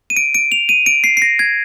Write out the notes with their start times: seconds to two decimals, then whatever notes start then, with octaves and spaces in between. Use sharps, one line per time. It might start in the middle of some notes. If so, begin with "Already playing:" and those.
0.10 D#7
0.17 D7
0.35 D7
0.52 F7
0.69 D#7
0.86 D7
1.04 C7
1.17 C7
1.22 A#6
1.39 G#6